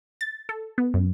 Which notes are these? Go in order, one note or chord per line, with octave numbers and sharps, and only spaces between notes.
A6
A4
B3
F#2